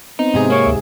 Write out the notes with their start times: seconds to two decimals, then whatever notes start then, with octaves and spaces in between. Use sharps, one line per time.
0.19 B3 C4 D#4
0.34 G#2 C3 G#4
0.50 A#3 C#5
0.66 D2 E5